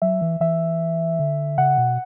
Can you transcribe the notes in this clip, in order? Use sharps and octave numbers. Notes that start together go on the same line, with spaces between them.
F#3 E5
E3
E3 E5
D3
C#3 F#5
B2